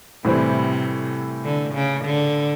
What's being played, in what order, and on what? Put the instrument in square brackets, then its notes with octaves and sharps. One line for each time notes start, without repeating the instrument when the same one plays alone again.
[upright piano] A2 E3 G3 C4 [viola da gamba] C3
[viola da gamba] D3
C#3
D3